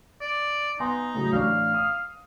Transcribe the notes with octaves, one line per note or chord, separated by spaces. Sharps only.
D5
B3 D#4 G#5 C6
A2 C#3 F#3
A1 D4 F5 C#6
D#6